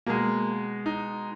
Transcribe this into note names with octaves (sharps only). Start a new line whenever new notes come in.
B2 G#3 A#3
D#4